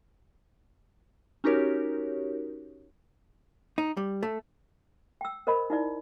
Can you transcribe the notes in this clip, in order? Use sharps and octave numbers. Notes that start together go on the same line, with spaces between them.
C#4 D#4 F#4 G4 A#4 C#5
D#4
G3
A3
G5 E6
A#4 C5 D#5 B5
D#4 E4 D5